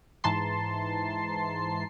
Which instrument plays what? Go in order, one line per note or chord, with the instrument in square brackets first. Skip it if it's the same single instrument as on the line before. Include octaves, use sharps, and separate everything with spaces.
[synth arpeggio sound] G#2 E3 A5 A#5 C6 C7